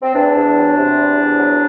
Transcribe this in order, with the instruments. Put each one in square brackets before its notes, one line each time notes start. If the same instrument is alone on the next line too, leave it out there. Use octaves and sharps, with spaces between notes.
[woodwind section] C4
E2 D4
E2
F#3
C3
E2
E2
F#3